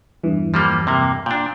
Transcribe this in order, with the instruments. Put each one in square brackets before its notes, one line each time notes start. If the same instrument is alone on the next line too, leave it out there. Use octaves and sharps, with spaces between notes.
[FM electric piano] E2 G2 E3
[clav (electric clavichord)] F3 G3 A#3
C3 A#3
[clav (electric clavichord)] A#2 D4 [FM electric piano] G5